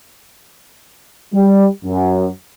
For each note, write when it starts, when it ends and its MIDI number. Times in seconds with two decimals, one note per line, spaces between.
1.33 1.66 55
1.85 2.27 42